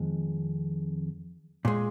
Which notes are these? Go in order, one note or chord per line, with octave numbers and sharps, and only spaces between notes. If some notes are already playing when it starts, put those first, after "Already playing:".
Already playing: F2 D#3 G#3
A#2 G#3